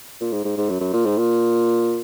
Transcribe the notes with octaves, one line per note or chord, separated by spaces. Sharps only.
A#2
G#2
G#2
G#2
F#2
F#2
A#2
G#2
A#2